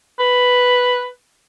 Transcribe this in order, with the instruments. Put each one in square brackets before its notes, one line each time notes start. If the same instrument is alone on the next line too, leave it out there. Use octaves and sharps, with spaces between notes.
[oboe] B4